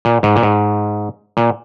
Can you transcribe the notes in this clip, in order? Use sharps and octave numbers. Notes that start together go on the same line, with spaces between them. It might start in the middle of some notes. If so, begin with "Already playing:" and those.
A#2
G#2
A#2
G#2
A#2